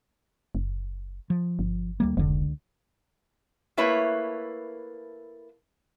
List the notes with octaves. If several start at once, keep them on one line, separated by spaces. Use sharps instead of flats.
F#1
F3
G1
D2 G3 A#3
F1 C#2 D3
A3 A#3 E4 B4 C#5